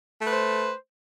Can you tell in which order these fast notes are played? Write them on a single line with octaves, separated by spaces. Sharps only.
A3 B4 C5